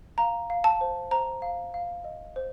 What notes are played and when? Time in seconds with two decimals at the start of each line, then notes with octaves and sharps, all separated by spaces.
0.18 F5 A#5
0.50 F5
0.64 A5
0.81 C5
1.11 C5 A#5
1.42 F5
1.74 F5
2.04 D#5
2.36 C5